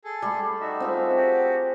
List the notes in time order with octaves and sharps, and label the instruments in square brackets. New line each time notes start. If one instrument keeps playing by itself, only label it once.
[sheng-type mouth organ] G#4 A4
[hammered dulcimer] G3 A3
[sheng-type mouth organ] D#4 F#4 E5
[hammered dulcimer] C4 F4 G#4
[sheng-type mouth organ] F#4 G4